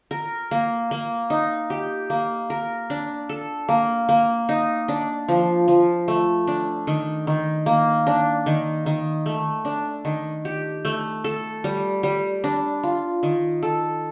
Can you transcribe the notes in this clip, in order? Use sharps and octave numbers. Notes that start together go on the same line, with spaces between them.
A#4
A#3
A#3
D#4
G4
A#3
A#4
D4
A4
A#3
A#3
D#4
D4
F3
F3
A3
D4
D#3
D#3
A#3
D4
D#3
D#3
A3
D4
D#3
G4
A3
A4
G3
G3
D4
F4
D#3
A4